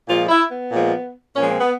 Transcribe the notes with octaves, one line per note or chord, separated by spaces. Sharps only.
A#2 F3 G#3 F4
E4
B3
A#2 F3 G#3
A#2 F3 G#3 C#4
C4
B3